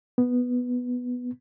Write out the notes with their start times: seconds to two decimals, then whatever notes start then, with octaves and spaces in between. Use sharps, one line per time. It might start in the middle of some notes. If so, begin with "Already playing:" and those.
0.18 B3